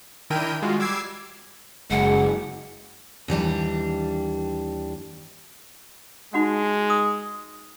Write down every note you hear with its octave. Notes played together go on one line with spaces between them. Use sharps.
D#3 D4 E4 A#4 G5 D#7
G#3 F4 F#4
G3 D6 E6 G#6 C7
F#1 G#3 F#5
D#2 E3 G3 D4
G#3 D#4 F#4 F#5
D#6